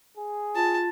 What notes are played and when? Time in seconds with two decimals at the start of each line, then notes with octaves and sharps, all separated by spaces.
0.18 G#4
0.55 F4 A5